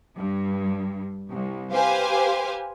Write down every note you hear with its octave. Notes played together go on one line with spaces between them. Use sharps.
G2
C2
G4 B4 C5 F5 G#5